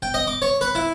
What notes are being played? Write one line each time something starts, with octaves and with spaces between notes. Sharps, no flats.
G5
D#5
D6
C#5
B4
E4